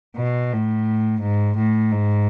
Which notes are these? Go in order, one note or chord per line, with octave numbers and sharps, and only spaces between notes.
B2
A2
G#2
A2
G#2